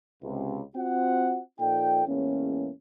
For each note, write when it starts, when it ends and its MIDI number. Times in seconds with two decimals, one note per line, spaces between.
0.22 0.60 37
0.22 0.60 48
0.75 1.39 60
0.75 1.39 65
0.75 1.39 66
0.75 1.39 78
1.59 2.03 46
1.59 2.03 53
1.59 2.03 63
1.59 2.03 69
1.59 2.03 74
1.59 2.03 79
2.07 2.70 40
2.07 2.70 45
2.07 2.70 56
2.07 2.70 58
2.07 2.70 61